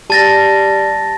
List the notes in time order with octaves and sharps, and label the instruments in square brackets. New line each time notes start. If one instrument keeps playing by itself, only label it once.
[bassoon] G3 [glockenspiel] A5 A6 A#6